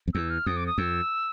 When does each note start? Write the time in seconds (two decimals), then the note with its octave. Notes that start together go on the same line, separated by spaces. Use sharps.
0.08 F2
0.14 E2 E6
0.30 F6
0.46 F2 D#6
0.57 D6
0.67 D#6
0.78 F2 E6